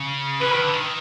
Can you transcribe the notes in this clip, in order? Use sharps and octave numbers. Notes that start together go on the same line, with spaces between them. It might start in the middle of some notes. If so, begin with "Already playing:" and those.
Already playing: C#3
E3 B4
D#3
D3
D#3